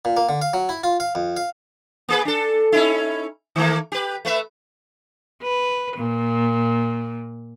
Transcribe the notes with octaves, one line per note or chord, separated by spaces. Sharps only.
A#2
A#3
D3
F5
F#3
E4
F4
F5
F2
F5
A#3 G#4 B4
D4 A4
C#4 D#4 E4
D#3 A3 A#3
G4 B4
A3 B4 E5
B4
A#2